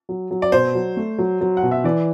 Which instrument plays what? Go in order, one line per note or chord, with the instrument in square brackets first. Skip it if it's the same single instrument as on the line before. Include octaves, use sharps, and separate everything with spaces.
[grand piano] F#3
F#3
[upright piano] D5
[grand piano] B2 [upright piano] C5
[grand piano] F#3
A3
F#3
F#3
[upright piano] F#5
[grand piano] B2
[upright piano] E5
[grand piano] E3 [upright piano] D5